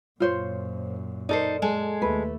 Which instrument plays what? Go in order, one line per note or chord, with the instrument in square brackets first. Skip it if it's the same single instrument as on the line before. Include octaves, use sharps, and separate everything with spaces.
[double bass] F#2 A#2 [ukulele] F4 C5 C#5
[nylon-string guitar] D#4 A4 C5 [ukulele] A#4 D5
[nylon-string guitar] G#3 G#4 A4
[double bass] D#2 A3 [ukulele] B4